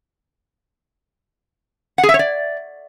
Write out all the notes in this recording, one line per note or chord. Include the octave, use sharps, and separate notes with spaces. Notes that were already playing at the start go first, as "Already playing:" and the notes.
F#5
G#4
E5
C#5
D5